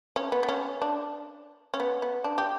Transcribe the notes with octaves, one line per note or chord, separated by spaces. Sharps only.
C#4
B3
B3
C#4
D4
C#4
B3
B3
D4
G4